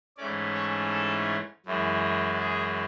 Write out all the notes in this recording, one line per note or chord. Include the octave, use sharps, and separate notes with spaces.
G#2 E3 A3 C#4 D5
C#5
A4
F#2 E3 G#3
G#4